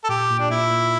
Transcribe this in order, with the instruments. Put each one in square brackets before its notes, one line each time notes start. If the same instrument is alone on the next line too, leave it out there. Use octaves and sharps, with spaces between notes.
[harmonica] A4
[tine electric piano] A#2 [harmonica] G4
[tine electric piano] A#2
[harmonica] D4
[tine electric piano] A#2 [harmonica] E4
[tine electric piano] A#2